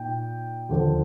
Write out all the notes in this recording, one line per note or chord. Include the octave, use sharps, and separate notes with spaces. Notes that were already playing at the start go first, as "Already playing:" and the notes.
Already playing: A#2 D#4 G5
D#2 D3 F3